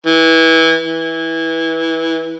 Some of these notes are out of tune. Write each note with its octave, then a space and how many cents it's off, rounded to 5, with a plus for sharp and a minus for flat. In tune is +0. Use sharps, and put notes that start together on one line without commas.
E3 -20
E3 -15